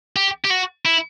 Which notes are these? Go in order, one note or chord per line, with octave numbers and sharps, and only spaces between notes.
G4
G4
F#4
E4